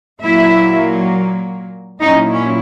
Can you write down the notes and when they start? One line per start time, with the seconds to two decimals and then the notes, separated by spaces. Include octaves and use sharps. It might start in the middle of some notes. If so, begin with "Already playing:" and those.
0.23 A#2 F#3 A#3 E4 E5
2.01 A#2 F#3 C#4 D#4 E4 D#5
2.31 C#4